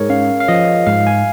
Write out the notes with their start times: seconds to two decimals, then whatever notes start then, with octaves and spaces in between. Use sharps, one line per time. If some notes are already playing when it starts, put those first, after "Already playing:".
Already playing: G#2 G#4 A#4 C#5
0.09 C#4 F5
0.40 F5
0.48 F3 D#5
0.87 G#2 F5
1.07 G#5